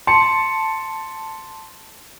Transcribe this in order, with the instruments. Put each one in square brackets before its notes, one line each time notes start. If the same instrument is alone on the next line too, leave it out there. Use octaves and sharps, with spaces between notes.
[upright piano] A5 [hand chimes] C6 C#7